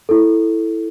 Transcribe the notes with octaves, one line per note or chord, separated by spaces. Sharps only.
E4 A4